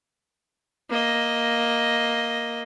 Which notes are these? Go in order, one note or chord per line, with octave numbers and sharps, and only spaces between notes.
A#3 D#5